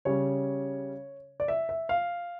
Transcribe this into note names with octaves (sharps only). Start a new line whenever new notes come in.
C#3 G3 C#4 C#5
D5
E5
E5
F5